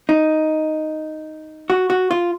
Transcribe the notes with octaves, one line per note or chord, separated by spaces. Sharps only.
D#4
F#4
F#4
F4